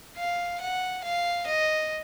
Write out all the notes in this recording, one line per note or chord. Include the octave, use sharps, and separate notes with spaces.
F5
F#5
F5
D#5